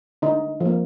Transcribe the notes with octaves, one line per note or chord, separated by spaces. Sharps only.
D3 D#4
F3 A#3